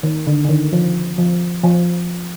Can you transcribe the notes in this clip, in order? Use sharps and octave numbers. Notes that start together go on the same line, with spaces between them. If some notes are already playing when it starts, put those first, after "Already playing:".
D#3
D3
D3
D#3
F3
F3
F3